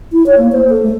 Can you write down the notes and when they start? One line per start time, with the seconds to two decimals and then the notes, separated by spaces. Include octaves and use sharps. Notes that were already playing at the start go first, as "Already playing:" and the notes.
0.12 E4
0.26 C#5
0.38 A#3
0.52 C5
0.69 A4
0.83 A3